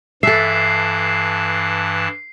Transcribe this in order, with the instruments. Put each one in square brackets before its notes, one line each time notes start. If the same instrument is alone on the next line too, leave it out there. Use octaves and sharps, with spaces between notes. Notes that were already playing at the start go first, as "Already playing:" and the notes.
[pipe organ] G2 E3 A5 [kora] A4 E5 [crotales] C7